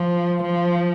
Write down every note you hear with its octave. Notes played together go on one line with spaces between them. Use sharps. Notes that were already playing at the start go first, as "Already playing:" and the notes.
Already playing: F3
F3